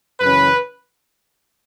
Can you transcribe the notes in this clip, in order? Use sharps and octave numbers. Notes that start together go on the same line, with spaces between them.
F#2 C#3 E3 C#4 B4